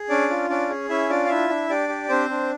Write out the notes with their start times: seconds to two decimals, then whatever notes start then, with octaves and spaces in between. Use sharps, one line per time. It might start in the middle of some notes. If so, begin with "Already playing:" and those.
Already playing: G#4
0.09 C#4 D4 D5
0.30 F4
0.50 C#4 D4 D5
0.69 G#4
0.89 C#4 E4 E5
1.10 D4 F4 D5
1.25 F5
1.29 D4 E4 E5
1.50 D4
1.69 D4 G4 D5
1.89 G4
2.09 C4 D4 C5
2.30 D4